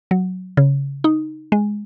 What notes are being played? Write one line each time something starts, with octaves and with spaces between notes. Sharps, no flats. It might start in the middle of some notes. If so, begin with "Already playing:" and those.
F#3
C#3
D#4
G#3